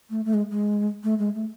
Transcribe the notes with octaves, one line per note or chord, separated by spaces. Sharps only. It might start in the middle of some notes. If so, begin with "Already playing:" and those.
A3
A3
G#3
G#3
A3
G#3
A3